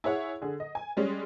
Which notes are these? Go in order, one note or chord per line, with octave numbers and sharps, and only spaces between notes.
E4 G#4 C#5 F#5
D3 G#4
D#5
G#5
G3 G#3 C#4